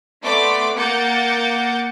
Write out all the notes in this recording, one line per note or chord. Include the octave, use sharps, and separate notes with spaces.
A3 B3 D5 C6 D6 B6
A#3 F#5 D6 G6 A6 C#7